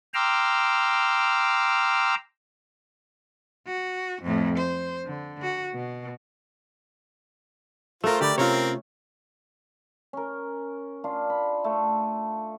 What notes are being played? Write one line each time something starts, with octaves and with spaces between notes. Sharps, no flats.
G5 A#5 C6 D6 E6 F6
F#4
F2 A2
C5
D3
F#4
B2
A3 F4 A#4 C5
D3 G4 D5 G5 B5
C3 C4 C#4 F4 A#4 C#5
C#4 A#4
D4 F4
B5
A3 A4